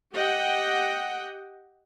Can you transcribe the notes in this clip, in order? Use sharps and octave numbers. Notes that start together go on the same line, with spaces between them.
G4 D#5 F#5 G5